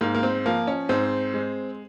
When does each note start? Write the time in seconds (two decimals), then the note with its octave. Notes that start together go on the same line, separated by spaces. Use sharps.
0.01 G#2 A#3
0.14 A#3
0.23 C4
0.46 F3 A#3
0.67 C#4
0.89 G#2 C4
1.34 G#3